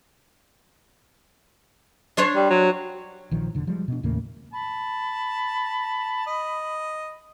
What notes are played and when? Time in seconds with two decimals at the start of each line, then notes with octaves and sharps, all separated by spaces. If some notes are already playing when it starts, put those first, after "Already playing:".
2.17 D4 C5 C#5
2.36 G3
2.50 F#3
3.31 A#1 D#3 F3
3.55 F1 D3
3.67 F3 G3 G#3
3.88 B2 D4
4.03 D#2 A2 C#3 A#3
4.53 A5 B5
6.26 D#5